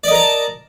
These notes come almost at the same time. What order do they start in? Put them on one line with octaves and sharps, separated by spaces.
D5 D#5 A#4 A#5 A5